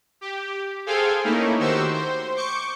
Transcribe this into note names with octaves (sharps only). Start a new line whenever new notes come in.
G4
G#4 A4 C5 F5 G5 G#5
A3 A#3 C#4 D#4 E4
D#3 F#4 G4 C5 C#6 E6
C5
C#6 D6 G6 C#7